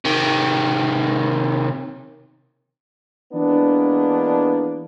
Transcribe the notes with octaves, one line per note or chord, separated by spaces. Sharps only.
C3 D#3
E3 G#3 A#3 B3 D4